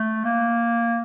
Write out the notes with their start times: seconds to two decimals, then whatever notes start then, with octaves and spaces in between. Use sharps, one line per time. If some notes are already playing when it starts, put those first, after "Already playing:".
Already playing: A3
0.25 A#3